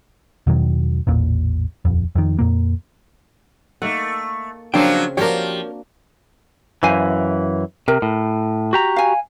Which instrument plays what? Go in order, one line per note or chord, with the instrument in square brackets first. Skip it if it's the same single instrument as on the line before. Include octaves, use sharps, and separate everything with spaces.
[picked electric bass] E2 B2 D#3 F#3
A1 E2 A#2
D#1 F2
F2 D#3
F2 A#2 A#3
[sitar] A3 [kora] A#3 D#4 F#5
[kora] C#3 C4 [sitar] F3 F#3 A#3 [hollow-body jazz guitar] D4 G5
[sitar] F3 G4 [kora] A#3 D4 F#4 [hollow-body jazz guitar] A#4 C#5
[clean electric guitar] F#2 E3 [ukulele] C5 F5 G#5
[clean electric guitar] C3 [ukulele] A#4
[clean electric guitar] A2
F#4 G4 A#5
[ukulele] F5 G#5